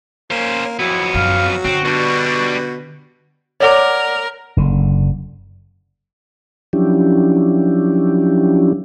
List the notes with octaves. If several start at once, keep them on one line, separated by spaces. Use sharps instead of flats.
A#3 C#4 C5
F2 F#3 B3 E4
F#2 F5
D3 C4 F#4
B2 G3 D4
A#4 C#5 D5 F#5 D6
F#1 D3
F3 F#3 C#4 D4 E4 G4